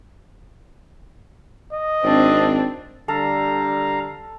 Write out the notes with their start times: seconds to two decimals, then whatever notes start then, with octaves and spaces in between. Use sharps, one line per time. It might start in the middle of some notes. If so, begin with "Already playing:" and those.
1.72 D#5
2.04 G#1 C4 D4
3.08 D3 G3 A4 F5 A#5